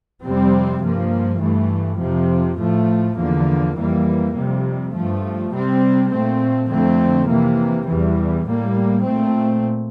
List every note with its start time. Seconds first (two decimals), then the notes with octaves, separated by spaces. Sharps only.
0.22 F2 C3 G3 C4
0.81 G2 F3 A#3
1.40 G2 E3 A3
1.99 F2 C3 F3
2.58 A2 F3 A3
3.17 E2 D3 F3 A#3
3.75 F2 E3 G3 A#3
4.34 F2 C3 G3
4.93 G2 F3 A3
5.52 C3 G3 C4
6.11 A#2 A3 C4
6.70 F2 D3 A3 C4
7.28 C3 E3 A#3
7.87 E2 E3 G3
8.46 A2 G3 A#3
9.05 A#2 A3 C4